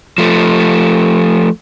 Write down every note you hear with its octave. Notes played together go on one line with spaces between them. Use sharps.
F3 A3